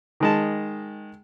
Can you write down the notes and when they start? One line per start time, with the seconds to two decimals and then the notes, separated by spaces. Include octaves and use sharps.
0.20 D#3 G#3 A5